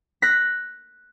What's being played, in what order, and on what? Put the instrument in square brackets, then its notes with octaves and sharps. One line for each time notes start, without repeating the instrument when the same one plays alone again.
[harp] F#6 A#6 B6